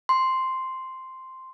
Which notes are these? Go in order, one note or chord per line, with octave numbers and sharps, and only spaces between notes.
C6